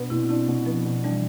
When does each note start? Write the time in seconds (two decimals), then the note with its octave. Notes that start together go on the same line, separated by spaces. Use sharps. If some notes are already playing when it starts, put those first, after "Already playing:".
Already playing: B2 B3 D4
0.10 B2 C4 E4
0.29 C4 D4 E4
0.48 B2
0.66 F3 B3
0.85 B2
1.04 E3 G3 D4